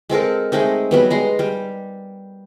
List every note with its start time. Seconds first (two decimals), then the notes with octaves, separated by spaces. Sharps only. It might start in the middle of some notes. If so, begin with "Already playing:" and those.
0.09 G#3 C4 A4 A#4
0.52 G#3 A3 C4 D#4
0.91 F#3 G3 B3
1.11 G#3 A#5 C6
1.39 G3